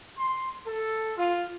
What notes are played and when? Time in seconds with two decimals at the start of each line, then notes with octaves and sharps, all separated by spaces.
0.17 C6
0.66 A4
1.16 F4